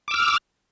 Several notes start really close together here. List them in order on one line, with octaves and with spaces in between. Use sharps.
D6 E6 F6